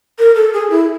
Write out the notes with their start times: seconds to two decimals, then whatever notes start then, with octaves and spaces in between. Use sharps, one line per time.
0.19 A#4
0.36 A4
0.53 G#4
0.70 E4